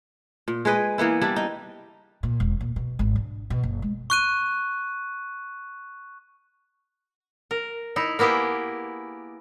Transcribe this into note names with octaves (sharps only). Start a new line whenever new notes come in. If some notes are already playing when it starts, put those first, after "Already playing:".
A#2
G#3 G#4 B4 D#5
E3 A#3 B3 E4
G3 D4 E4
D#4
A#2
E1
A#2
B2
G#1
D4
B2
F#1
G#3
C#6 F#6 D#7
A#4
D#4 E4
A#3 B3 E4 G4 G#4